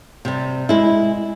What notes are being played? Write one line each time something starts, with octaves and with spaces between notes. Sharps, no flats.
C3 G3
G#3 E4